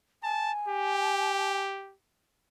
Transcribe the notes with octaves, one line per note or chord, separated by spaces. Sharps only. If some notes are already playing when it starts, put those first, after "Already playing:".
G#5 A5
G4